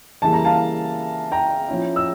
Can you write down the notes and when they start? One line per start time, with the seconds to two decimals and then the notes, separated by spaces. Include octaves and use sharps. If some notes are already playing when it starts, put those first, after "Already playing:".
0.22 C#3 E3 G3 A#3 A5
0.33 A#5
0.45 F5 A5
1.32 G5 A#5
1.68 F3 C#4 E4
1.96 E6